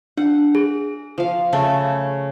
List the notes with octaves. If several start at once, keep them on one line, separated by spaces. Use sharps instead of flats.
D4 F#5
G#4
F3 F5
C#3 A3 A4